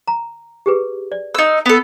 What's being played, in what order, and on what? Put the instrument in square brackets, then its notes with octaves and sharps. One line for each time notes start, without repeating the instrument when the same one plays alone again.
[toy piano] A#5
G4 G#4 B4
D5
[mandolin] D#4 E6
B3 A4